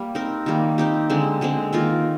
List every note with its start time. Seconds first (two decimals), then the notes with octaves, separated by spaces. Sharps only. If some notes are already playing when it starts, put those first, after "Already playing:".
Already playing: G3 A#3
0.15 C4 D#4 A#4
0.46 D#3 G3 A#3
0.78 C4 D#4 G4
1.10 D3 G#3 C4
1.41 D3 G#3 C4
1.73 D#3 A#3 F4 A#4